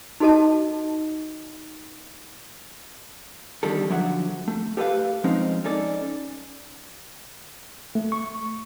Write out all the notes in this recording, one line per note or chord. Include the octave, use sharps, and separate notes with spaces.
D#4 F#4 A4 D#5 A5
E2 G#2 D3 D#3 G3 A4
D3 F3 F#3 E5 F#5
A3
G4 A4 B4 E5 F5
F3 G#3 C4 C#4 D#4
C#4 D#4 A4 D5
A3
C#6